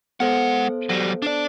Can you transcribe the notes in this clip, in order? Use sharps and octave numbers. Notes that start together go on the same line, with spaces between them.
G#3 B3 A4 C5 F#5
F#3 G3
D4 D5